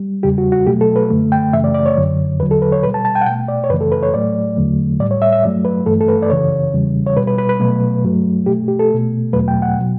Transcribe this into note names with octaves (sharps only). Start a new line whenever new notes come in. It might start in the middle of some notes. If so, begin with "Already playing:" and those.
Already playing: G3
E2 C#3 G3 G4
F#4
F#4
B2 F#3 A3 G4
A4
B4
F#2 D3 A3
G5
F#2 C#3 E3 A3 E5
D5
D5
C#5
F#2 D3 F#3
E2 D3 F#3 B4
A4
B4
C#5
B2 G3 B4
A5
A5
G5
F#5
B2 A3 G5
D5
C#5
F#2 C#3 E3 A3 B4
A4
B4
C#5
A2 F#3 A3 D5
E2 D3 F#3 A3
A2 G3 D5
C#5
E5
E5
G2 F#3 A3 D5
B4
G2 E3 A3 A4
A4
B4
D5
F#2 C#3 E3 C#5
E2 C#3 E3 G3
C#5
B2 G3 B4
B4
B4
B4
B2 F#3 A3
G2 F#3 A3
B2 A3 G4
G4
A4
B2 A3
E2 B2 F#3 A3 B4
G5
F#5
B2 F#3